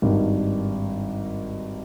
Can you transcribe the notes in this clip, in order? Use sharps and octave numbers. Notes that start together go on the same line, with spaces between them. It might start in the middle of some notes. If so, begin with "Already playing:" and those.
G#1 G2 D#3